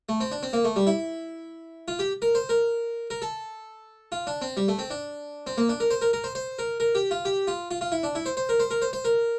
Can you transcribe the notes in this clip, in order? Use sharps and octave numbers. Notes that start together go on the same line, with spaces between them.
A3
C4
D4
C4
A#3
A3
G3
E4
F4
G4
A#4
C5
A#4
A#4
A4
F4
D4
C4
G3
A3
C4
D4
C4
A#3
D4
A#4
C5
A#4
A#4
C5
C5
A#4
A#4
G4
F4
G4
F4
F4
F4
E4
D4
E4
C5
C5
A#4
C5
A#4
C5
C5
A#4